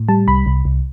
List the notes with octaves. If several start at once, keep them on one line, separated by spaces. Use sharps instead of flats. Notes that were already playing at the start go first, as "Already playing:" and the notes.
Already playing: A2
G3 A5
C2 B5
C2
C2